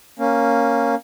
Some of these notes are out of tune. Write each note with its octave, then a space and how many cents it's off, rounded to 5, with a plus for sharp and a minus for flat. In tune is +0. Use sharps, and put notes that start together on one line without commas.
A#3 +0 C#4 +0